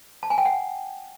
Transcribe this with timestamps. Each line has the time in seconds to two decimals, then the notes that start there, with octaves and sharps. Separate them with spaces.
0.23 A5
0.30 G#5
0.38 G5
0.45 F#5